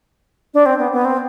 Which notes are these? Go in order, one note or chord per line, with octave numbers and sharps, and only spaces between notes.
D4
C4
B3
B3
C4